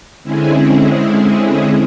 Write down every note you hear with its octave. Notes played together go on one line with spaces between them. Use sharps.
D3 G#3 C4 C#4 E4 G#4